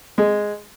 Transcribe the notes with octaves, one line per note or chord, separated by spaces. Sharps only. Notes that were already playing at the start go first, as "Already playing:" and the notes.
G#3